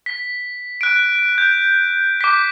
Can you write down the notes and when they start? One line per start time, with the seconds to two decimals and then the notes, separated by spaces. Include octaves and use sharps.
0.06 B6
0.81 F#6 D7
1.38 G6
2.21 D6 B6